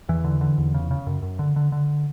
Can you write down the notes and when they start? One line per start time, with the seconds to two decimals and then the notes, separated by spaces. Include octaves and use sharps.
0.09 E2 E3
0.24 D3
0.41 D3
0.58 E2
0.74 C#3
0.91 C#3
1.07 F#2
1.22 F#2
1.39 D3
1.56 D3
1.72 D3